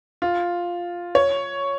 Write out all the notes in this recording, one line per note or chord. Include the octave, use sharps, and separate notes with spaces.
F4
C#5